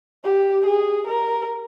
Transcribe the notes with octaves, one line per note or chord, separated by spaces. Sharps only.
G4
G#4
A#4